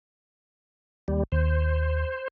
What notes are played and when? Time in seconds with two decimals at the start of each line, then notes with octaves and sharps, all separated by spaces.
1.08 D#2 G3
1.32 D#2 C5